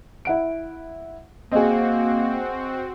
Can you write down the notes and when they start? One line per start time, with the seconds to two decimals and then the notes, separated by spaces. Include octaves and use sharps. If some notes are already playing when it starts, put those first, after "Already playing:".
0.25 E4 F#5 D7
1.52 A#3 C4 F#4 G#4 D#5